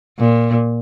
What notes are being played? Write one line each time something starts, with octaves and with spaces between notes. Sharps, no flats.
A#2